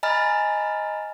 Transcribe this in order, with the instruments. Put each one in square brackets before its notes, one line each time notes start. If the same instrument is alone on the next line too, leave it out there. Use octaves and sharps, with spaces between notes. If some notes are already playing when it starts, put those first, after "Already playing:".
[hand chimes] D#5 G#5 A#5 B5 F6 A6